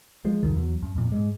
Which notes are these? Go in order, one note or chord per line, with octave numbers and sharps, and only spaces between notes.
F3 G#3
C2 F2 D#3
E2 F#3
F#2
F2 A#2
G#2 G#3